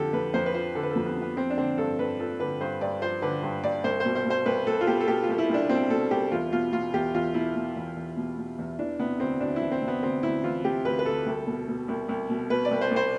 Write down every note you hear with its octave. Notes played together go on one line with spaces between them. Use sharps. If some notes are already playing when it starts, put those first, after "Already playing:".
Already playing: F2 D3 F3 G4 A4
F2 B4
F2 C5
B4
F3 C5
D3 A4
B4
F2 A4
B3
F2
B3
F3 C4
D4
D3 C4
G2 A4
G2 B4
F3 A4
D3 B4
G2 C5
G2 D5
F3 C5
D3 B4
G2
G2 D5
C2 C5
B2 C5
C5
B2
C5
C2 B4
C2 A4
F4
B2 G4
A4
B2 G4
F4
C2
E4
C2 D4
B2 C4
B2 A4
C2 G4
E2 F4
B2 F4
B2 F4
E2 G4
E2 F4
B2 E4
B2
E2
E2
B2
B2
E2
E3 D4
C3 B3
D2 C4
D2 D4
E4
E3
C4
C3
B3
D2 C4
D2 E4
E3 F4
C3 G4
D2 B4
B4
D2 A4
C2
B2
B2
C2
C2
B2
B2 B4
D5
C2
C5
C2
C5